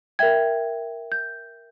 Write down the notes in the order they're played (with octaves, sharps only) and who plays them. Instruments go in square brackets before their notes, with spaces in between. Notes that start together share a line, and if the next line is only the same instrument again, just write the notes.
[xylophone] A#4 E5 G5 G#6
G6